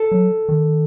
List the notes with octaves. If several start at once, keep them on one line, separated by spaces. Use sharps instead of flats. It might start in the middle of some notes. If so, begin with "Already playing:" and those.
Already playing: A4
F#3
D#3